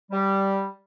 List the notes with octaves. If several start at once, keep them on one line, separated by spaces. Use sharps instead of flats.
G3